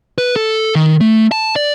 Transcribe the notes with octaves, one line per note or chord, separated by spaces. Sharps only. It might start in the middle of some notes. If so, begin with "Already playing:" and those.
B4
A4
D#3
A3
A5
D5